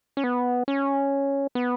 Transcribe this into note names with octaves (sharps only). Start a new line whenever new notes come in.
C#4
B3
C#4
B3